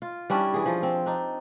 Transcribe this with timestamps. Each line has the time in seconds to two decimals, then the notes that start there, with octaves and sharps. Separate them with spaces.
0.02 F4
0.30 G3 C#4 D4 E4
0.54 E3 G#4
0.66 F3
0.83 C4
1.06 D4 D#4